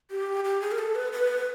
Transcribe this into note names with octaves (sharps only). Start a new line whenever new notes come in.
G4
G4
G#4
A#4
A4
B4
B4